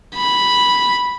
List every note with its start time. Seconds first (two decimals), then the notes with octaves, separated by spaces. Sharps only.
0.16 B5